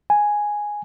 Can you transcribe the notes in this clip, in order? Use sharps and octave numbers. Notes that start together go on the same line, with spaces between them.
G#5